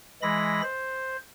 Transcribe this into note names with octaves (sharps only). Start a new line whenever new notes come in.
E3 G#3 B5 A#6
C5